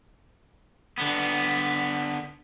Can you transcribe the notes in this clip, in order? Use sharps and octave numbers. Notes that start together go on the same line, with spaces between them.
D3 B3